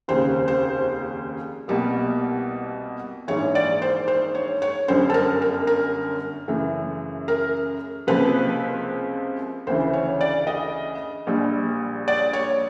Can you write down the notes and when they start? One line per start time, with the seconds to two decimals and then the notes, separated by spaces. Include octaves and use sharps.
0.08 F1 D#2 C#3 C5
0.48 C5
1.68 C2 B2 G3 A#3
3.27 A#1 G#2 E3 C#5
3.55 D5
3.82 C5
4.08 C5
4.35 C#5
4.62 C#5
4.88 G1 F#2 D3 C5
5.10 A4
5.14 A#4
5.42 A#4
5.67 A#4
6.48 F#2 C#3 E3 A3
7.28 A#4
8.07 C#2 C3 F3 A#3 B4
9.67 D2 C#3 E3 C5
9.93 C#5
10.21 D5
10.47 D#5
11.27 A#1 A#2 G3
12.08 D5
12.33 C#5